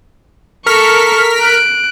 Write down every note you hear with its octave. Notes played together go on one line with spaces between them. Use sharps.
A4 A#4 C#6 F6 B6
F#6 D7